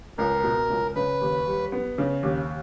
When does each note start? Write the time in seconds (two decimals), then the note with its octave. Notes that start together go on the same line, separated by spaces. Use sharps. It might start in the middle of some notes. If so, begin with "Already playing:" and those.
0.18 C#2 A#4
0.44 B2
0.70 C#2
0.96 C#3 B4
1.21 D#2
1.46 G3
1.72 B3
1.98 C#3
2.23 D#2